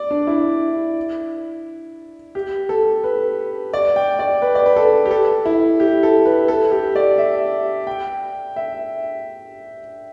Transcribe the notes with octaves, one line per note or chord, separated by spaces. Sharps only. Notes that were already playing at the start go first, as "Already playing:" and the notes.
Already playing: D5
D4
E4
G4
A4
B4
D5
G5
D5
B4
D5
B4
A4
G4
A4
E4
G4
A4
B4
A4
G4
D5
E5
G5
E5